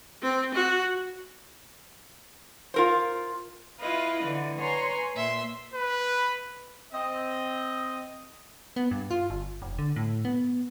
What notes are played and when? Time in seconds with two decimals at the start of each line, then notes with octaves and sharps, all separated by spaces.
0.23 C4
0.54 F#4
2.74 F4 A#4 C5
3.78 E4 F4 B4 D#5 F5
4.22 D3 E3
4.58 B4 C#5 G#5 A#5 C6
5.14 A#2 E5 C6
5.74 B4
6.93 C4 D#5
8.76 B3
8.91 G2
9.11 F4
9.30 G1
9.62 F1
9.78 D3
9.96 A2
10.25 B3